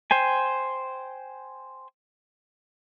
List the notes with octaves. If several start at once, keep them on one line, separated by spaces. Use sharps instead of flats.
C5 G5 G#5